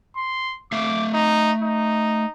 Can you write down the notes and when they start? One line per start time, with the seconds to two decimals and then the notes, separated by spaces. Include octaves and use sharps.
0.16 C6
0.72 A3 E5 F5 D6
1.14 D#4
1.62 D#4